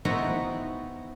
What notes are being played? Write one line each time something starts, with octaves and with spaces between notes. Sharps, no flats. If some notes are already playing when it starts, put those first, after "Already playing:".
B3 C4 D#4 E4 F#4 B4